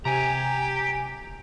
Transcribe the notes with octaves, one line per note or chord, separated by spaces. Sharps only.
C3 G4 G#5 A#5